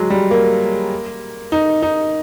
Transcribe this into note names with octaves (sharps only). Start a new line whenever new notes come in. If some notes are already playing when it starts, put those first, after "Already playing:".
Already playing: F#3 G#3
G3
A#3
D#4
D#4